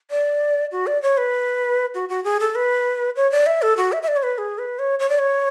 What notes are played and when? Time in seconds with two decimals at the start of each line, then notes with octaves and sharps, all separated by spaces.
0.11 D5
0.72 F#4
0.87 D5
1.03 C#5
1.17 B4
1.94 F#4
2.09 F#4
2.24 G#4
2.40 A4
2.55 B4
3.16 C#5
3.32 D5
3.46 E5
3.62 A4
3.77 F#4
3.92 E5
4.03 E5
4.08 D5
4.16 C#5
4.23 B4
4.38 G#4
4.58 B4
4.79 C#5
4.99 C#5
5.09 D5
5.19 C#5